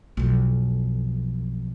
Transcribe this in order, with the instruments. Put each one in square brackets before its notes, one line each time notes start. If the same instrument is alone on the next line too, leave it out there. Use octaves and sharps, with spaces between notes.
[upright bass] B1 F2